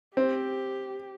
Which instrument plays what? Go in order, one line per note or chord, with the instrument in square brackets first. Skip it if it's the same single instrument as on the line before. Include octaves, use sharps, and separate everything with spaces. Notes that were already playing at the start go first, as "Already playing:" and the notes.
[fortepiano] C4 [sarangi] G4